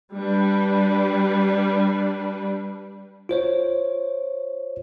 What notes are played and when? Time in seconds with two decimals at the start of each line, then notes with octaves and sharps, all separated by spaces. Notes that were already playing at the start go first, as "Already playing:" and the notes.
0.16 G3 D4 B4
3.29 F4 C5 C#5